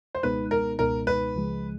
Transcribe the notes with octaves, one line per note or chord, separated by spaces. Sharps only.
C5
C#2 B2 G#3 B3 D#4 B4
A#4
C#2 B2 G#3 B3 D#4 A#4
B4
C#2 C#3 F3 G#3